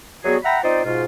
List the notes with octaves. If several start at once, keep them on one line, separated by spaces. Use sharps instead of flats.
F#3 G3 B3 F#4 G#4
E5 F#5 G5 A#5 B5
C4 D#4 F4 C5 D5
G#2 B2 F4